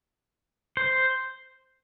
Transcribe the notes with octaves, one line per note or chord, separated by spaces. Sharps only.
C5